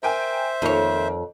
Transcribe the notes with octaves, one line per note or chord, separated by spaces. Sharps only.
A#4 C5 E5 G5 G#5
F2 D#3 A#3 C#5